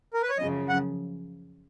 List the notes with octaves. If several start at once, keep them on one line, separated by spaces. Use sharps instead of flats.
A#4
B4
C#5
F#2 C#3 F3 D#5
F#5